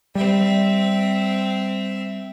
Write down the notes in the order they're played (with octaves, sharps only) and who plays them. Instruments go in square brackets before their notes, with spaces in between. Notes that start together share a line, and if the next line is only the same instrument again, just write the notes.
[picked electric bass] G3 [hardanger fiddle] C4 E5